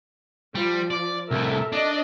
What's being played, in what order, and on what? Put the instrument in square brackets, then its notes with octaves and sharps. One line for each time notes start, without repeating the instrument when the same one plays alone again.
[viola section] F3 [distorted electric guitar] G3
[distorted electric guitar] D5
[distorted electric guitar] C2 A2 [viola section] A4 A#4 E5
[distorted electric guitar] D4 [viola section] D5 D#5